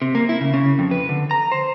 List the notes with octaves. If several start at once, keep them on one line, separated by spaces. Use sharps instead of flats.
C3
A#3
E4
C#3
C#3
F2
B4
D3
A#5
C5